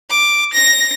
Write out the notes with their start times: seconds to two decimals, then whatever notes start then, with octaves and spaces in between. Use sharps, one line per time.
0.10 D6
0.53 A#6